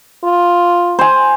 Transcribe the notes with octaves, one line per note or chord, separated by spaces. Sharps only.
F4
C5 G#5